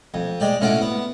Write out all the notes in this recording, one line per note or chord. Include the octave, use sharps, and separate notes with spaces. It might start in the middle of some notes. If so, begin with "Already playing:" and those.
F2
G#3 D5 G5
A2 C#4 F4 F#4 D6
B3